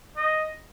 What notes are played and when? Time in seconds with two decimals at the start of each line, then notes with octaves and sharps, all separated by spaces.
0.16 D#5